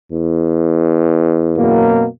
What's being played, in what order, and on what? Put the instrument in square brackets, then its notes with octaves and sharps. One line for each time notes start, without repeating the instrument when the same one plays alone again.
[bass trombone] E2
[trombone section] F#2 B2 A#3